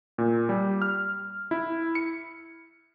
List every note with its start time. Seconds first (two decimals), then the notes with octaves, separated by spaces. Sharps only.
0.18 A#2
0.49 G3
0.82 F6
1.51 E4
1.95 C#7